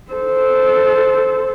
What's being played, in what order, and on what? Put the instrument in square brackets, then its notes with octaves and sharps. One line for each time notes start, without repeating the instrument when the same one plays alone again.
[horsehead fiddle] A4 C5